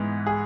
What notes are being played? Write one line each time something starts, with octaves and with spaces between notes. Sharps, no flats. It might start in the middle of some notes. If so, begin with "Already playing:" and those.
Already playing: G#2 E3 B3
G#4